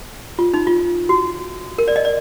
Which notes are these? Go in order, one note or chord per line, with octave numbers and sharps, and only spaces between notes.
F4
D#4
F4
F#4
A#4
D5
D#5
D5